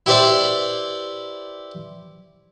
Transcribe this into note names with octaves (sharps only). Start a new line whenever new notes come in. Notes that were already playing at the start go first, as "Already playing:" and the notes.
E4 G4 B4 C5 D5 E5